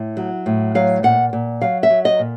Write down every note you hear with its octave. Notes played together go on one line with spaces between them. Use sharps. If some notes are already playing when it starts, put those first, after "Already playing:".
Already playing: A2
F#3
A2
F#3 F5
A#2 F#5
A#2
F#3 F5
E5
F#3
D#5
A#2